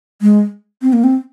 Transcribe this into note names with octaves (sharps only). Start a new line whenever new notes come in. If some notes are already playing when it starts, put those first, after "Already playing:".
G#3
C4
A#3
C4